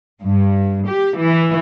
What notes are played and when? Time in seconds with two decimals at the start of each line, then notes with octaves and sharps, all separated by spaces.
0.21 G2
0.87 G4
1.18 E3